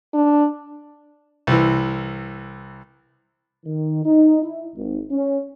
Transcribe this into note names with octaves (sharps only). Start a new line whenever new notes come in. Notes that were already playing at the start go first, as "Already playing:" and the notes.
D4
C2 E3
D#3
D#4
E4
G#1
C#4